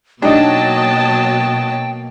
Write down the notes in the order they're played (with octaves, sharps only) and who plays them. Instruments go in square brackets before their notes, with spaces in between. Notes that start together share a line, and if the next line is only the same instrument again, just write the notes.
[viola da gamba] B2 A#3 [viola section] F#3 D#5 A5 [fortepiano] D4 D#4 [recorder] G5